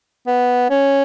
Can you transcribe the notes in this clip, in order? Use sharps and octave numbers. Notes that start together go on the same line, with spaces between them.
B3
C#4